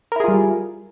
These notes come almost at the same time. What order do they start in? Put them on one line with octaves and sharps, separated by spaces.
A#4 E4 G#4 F4 G3